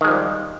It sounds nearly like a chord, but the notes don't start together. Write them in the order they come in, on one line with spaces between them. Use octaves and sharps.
D#3 G#3 F3 G3